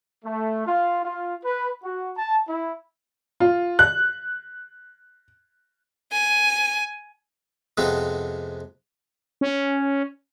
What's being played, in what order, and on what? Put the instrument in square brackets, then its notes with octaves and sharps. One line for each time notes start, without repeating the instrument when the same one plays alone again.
[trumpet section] A3
F4
F4
B4
F#4
A5
E4
[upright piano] F4
F#6
[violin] G#5
[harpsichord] F2 C3 G#3 B3 C4
[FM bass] C#4